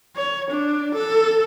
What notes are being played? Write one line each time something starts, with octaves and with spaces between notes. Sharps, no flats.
C#5
D4
A4